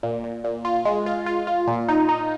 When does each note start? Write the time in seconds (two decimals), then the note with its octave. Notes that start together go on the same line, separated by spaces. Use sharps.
0.03 A#2
0.24 A#2
0.44 A#2
0.65 F4
0.85 G#3
1.06 F4
1.26 F4
1.47 F4
1.68 A#2
1.88 D#4
2.09 D#4